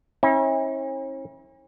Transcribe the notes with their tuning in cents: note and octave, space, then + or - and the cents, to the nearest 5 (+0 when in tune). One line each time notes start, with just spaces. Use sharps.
C#4 -45 E4 -40